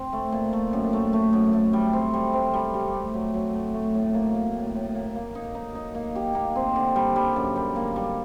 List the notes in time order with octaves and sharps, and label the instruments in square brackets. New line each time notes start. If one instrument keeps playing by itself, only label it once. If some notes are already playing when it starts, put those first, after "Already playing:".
Already playing: [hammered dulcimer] C4
A3
A#2
A3
F#2
A3
A3
F#2
A3
G3
C4
G3
C4
G3
G4
A3
F#3
F#3
A3
A3
A2
A#3
A#3
A2
A2
A#3
A#3
D#4
D#4
D#4
A#3
G4
A#3
C4
D3
G3
G3
F#2
G3
A#3
G3